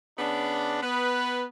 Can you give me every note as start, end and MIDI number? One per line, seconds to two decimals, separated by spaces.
0.18 0.78 49
0.18 0.78 59
0.18 0.78 62
0.81 1.45 59
0.81 1.45 71